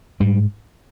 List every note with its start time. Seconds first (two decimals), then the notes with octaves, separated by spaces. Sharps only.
0.20 G#2 G3